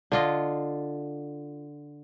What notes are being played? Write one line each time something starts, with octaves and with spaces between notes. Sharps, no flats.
D3 F4 D#5